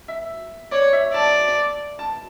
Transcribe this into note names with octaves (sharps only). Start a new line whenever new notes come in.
E5
C#5 D5
E5
D5 A5
A5